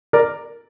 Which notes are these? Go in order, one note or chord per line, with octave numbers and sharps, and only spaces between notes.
A#4 D5